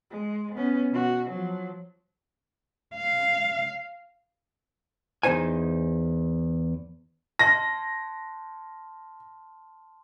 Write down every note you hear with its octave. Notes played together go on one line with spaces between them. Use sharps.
G#3
B3 C#4
B2 F#4
F3 F#3
F5
E2 G#2 D#4 C5 G#5
A5 C6 A#6